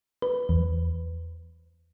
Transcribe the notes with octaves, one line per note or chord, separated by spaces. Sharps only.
B4
E2